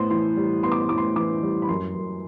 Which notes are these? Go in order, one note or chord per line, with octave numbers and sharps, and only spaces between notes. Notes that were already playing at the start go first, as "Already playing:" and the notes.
Already playing: A2 B3 C5 C6
E3 C6
G3
B3 C6
D6
C6
A2 D6
C6
E3 D6
G3
B5
F#2 C6
F#2